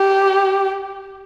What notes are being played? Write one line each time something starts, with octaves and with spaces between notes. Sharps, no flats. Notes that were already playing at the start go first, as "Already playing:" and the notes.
Already playing: G4